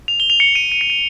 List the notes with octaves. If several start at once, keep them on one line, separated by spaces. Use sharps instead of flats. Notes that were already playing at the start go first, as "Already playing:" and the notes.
F7
G7
F7
C#7
D#7
D#7
C#7
D#7